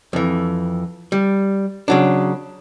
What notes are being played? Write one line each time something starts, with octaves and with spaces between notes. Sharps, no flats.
F2 E3
G3
C#3 F#3 D4